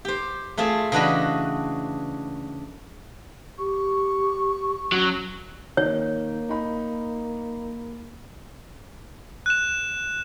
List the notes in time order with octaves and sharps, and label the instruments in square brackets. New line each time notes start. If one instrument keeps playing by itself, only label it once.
[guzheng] G4 C5
A3 C4 F4 G#4 A5
C#3 E3 D4 F#4 D#5 B5
[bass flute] G4 [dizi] C#6
[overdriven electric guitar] F#3 [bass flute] C#4
[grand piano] D#3 [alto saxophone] A#3 [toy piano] C#5
[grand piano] D#4 B5
[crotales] F#6 E7